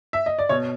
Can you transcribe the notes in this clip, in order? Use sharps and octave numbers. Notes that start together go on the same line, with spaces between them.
E5
D#5
D5
B2 C#5